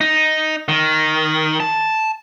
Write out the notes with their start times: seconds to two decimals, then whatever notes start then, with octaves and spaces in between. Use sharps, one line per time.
0.01 D#4
0.68 D#3
1.60 A5